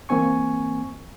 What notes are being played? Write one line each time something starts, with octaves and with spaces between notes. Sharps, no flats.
E3 A#3 C4 G#5 C#6